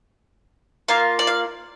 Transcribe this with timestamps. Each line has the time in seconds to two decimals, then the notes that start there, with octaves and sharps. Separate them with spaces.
0.88 A#3 F4 F5
1.19 D5
1.27 F5